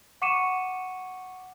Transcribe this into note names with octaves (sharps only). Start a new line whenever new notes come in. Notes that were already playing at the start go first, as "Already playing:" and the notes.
F#5 C#6 D6 C#7 D#7 E7